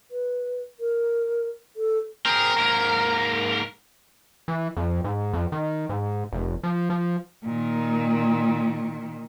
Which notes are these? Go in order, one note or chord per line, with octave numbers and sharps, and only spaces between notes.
B4
A#4
A4
C4 G#4 A#4
G#2 A#3
E3
F2
G#2
F2
D#3
G#2
F1
F3
F3
A#2 D#3